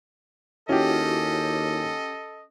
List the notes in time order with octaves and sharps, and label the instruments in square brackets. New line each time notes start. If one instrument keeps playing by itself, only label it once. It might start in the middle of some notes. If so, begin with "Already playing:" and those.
[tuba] D#2 [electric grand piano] C#4 G4 [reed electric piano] E4 F#4 [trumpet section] A4 D#5